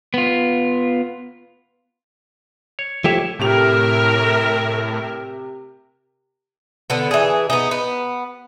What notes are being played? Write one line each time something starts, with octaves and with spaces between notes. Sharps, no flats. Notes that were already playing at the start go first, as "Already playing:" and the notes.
B3 F4
C#5
F3 A3 E4 G4 C#5 E5
A2 C3 G4 A#4 E5 F7
D3 B3
E3 G#4
B3 D#4
B3